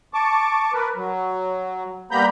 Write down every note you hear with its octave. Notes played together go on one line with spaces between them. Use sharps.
A5 C#6 D6
A#4 B4
F#3
G3 A#3 B3 A#5 B5 G6